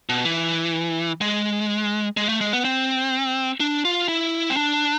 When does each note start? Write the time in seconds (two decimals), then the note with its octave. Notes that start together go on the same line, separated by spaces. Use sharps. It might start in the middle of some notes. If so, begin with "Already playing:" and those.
0.09 B2
0.25 E3
1.21 G#3
2.17 G#3
2.29 A3
2.41 G#3
2.53 B3
2.65 C4
3.60 D4
3.85 F4
4.08 E4
4.50 C4
4.56 D4